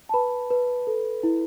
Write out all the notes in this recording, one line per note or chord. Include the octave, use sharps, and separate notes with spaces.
A5
B4 B5
B4
A4
E4